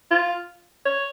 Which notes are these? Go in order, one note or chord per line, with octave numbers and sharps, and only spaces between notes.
F4
C#5